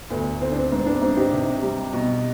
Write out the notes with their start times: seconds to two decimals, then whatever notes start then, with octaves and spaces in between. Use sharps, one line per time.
0.10 D2 B3
0.41 D2 C4
0.52 D4
0.56 C4
0.72 G#2 C4
0.86 B3 D4
1.01 G#2 C4 D#4
1.17 D#4 G4
1.32 C3
1.62 G3
1.93 B2